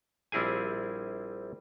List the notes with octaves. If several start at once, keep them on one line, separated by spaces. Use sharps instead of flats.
A#1 G3 C4 E4 G#4 G#5